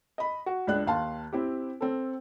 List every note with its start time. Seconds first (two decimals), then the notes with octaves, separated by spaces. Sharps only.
0.18 D#5 B5
0.46 F#4
0.67 C#2 D4 F#6
0.86 D#2 F5 A5 C6
1.33 C4 E4 G4
1.81 C4 A4